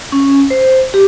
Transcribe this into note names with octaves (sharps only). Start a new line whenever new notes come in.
C#4
C5
G4